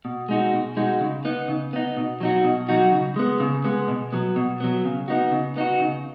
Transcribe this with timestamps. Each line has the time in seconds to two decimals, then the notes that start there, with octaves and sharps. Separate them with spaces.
0.05 B2
0.29 G#3 D#4 F#4
0.53 B2
0.77 G#3 D#4 F#4
1.01 C#3
1.25 B3 D#4
1.48 C#3
1.73 B3 D#4
1.97 B2
2.20 F#3 D#4 F#4
2.44 B2
2.69 F#3 D#4 F#4
2.92 C#3
3.16 G#3 B3
3.40 C#3
3.65 G#3 B3
3.88 B2
4.12 F#3 B3
4.36 B2
4.60 F#3 B3
4.84 C#3
5.08 B3 D#4 F#4
5.32 C#3
5.56 B3 D#4 F#4
5.80 C#3